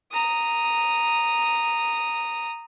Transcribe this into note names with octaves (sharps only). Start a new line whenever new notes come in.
A#5 D#6